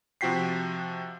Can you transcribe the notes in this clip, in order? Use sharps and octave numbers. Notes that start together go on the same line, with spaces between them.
C3 F3 F#4 G5 B6 C7